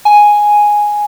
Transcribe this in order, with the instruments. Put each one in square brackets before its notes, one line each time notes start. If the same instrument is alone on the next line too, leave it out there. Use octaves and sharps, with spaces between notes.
[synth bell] G#5